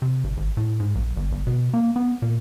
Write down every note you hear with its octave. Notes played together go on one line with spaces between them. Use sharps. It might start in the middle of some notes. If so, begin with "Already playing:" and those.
C3
G1
G#1
A2
G#2
A#1
G1
G1
B2
A#3
B3
A#2